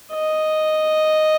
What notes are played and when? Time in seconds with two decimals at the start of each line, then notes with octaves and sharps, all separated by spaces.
0.13 D#5